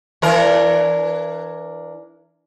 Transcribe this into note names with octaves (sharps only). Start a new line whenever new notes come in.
E3 D4 A#4